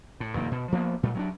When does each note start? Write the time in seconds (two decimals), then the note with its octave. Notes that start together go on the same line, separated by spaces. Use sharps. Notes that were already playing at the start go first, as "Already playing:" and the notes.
0.20 A2
0.34 F1 G2 D#3 A#3
0.51 B2
0.72 F3 A#3 B3
1.03 A#2 G3 A3
1.15 F#3 B3 D4